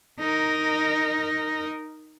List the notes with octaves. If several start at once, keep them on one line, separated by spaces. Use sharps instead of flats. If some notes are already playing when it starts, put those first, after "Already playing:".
D#4 A#4